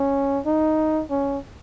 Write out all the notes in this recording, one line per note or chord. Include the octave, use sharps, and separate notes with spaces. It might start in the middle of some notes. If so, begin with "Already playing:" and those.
Already playing: C#4
D#4
C#4